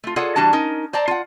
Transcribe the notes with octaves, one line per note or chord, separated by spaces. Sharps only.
A3 F4
F4 G#4 A4 C#5 D5 F#5
E3 G3 D4 F#4 A5
C#4 D#4 A#4
C5 D5 A5 A#5
F4 F#5